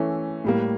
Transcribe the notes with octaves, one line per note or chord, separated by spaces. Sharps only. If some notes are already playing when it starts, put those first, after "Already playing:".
Already playing: E3 A3 C#4
A2 G3 A#3